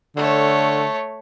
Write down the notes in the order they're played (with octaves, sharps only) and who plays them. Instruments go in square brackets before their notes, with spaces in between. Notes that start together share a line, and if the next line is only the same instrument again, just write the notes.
[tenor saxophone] D3 [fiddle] A3 C#5